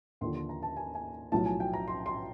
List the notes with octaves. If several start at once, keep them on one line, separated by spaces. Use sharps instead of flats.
D#2 D3 F3 C6
C6
A#5
A5
G#5
G#5
B1 A2 F3 A5
G#5
G5
A#5
C6
C6